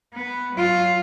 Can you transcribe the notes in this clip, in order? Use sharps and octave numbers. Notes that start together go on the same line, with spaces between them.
B3
F#3 F4